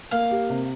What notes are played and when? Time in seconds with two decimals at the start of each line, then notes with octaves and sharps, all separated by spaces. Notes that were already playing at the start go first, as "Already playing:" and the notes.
0.11 A#3 F5
0.31 G4
0.50 C3